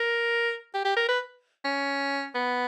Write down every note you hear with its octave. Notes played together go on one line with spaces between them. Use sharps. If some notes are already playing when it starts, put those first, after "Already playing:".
Already playing: A#4
G4
G4
A#4
B4
C#4
B3